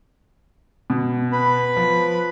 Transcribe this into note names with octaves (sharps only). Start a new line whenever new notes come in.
B2
B4 B5
F3